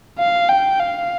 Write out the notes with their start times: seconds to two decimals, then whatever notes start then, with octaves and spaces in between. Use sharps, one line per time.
0.19 F5
0.49 G5
0.80 F5